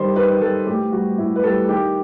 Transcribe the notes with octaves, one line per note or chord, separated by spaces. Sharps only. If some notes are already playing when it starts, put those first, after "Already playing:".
Already playing: D#3 G3 C5
D#3 B4
G3 A4
A2 G4
G3 F#4
A2 E4
B4
G3 A4
D#3 G4